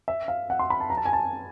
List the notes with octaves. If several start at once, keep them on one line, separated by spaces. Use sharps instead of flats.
E5
F5
F#5
C6
B5
A5
A#5
A5
G#5
A5